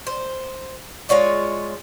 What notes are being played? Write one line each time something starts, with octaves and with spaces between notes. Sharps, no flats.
C5
G#3 F4 C#5 D5